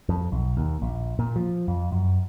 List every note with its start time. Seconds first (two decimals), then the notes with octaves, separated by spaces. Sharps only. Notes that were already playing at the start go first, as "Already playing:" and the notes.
0.09 F2
0.32 B1
0.57 D#2
0.82 A#1
1.19 A#2
1.36 F3
1.68 F2
1.92 F#2